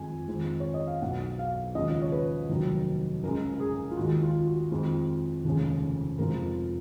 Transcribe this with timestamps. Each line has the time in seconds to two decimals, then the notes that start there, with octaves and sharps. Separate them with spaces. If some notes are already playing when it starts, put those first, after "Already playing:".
Already playing: F2 D#3 G#3 G#5
0.28 F2 D#3 G#3
0.60 C#5
0.74 D#5
0.87 F5
1.01 B1 B2 F#3 F#5
1.39 F5
1.75 D#2 C#3 F3 G#3 D#5
2.02 C#5
2.12 B4
2.49 F1 D#2 D#3 F#3
3.23 C#2 C#3 G#3 A#4
3.54 A#4
3.60 G#4
3.91 F4
3.97 D#2 D#3 G#3 F#4
4.22 F4
4.47 F#4
4.72 F2 D#3 G#3
5.45 F1 D#2 C#3 G#3
6.19 F1 F2 F3 G#3 A#4